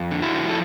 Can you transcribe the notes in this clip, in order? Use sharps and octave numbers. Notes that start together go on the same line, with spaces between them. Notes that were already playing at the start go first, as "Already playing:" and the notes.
Already playing: F2
D3
E4 F#4
F3
A4